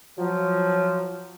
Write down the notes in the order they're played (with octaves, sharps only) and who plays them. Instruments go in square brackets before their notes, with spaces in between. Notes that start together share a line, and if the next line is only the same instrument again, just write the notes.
[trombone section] F3 F#3